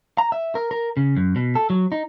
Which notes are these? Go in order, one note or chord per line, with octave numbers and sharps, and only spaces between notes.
A#5
E5
A#4
A#4
C#3
F#2
B2
A4
F#3
D#4